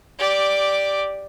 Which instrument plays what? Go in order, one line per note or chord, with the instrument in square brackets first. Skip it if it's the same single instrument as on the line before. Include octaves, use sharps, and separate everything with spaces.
[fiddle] G4 D5